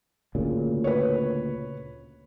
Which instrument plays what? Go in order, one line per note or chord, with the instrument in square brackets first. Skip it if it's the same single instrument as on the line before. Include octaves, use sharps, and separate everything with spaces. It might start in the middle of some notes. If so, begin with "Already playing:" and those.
[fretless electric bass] D2 A#2 C#3
[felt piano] B4 C#5